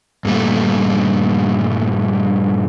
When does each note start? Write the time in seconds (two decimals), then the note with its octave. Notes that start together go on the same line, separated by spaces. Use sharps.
0.25 G2 A#2 G3 A3